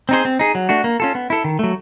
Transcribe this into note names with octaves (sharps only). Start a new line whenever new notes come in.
C4 D#4 G#4 C5
C4
D#4 G#4
F#3
A3 D4 F#4
A#3
C#4 F4 A4
B3
E4 A4
D#3
F#3 A3